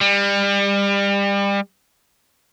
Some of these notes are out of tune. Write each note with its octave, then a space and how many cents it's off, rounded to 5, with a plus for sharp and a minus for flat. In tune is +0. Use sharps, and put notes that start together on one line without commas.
G3 +30